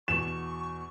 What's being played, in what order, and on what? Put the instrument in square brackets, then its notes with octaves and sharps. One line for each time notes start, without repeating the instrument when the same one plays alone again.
[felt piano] E2 B2 [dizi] C#6 [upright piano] E7